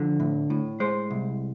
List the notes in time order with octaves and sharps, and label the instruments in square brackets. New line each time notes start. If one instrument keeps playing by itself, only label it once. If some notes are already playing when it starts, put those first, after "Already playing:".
Already playing: [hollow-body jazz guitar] D3 F3
A2
A2
G#3 C5
C2